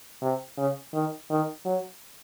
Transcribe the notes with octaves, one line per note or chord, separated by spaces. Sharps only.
C3
C#3
D#3
D#3
F#3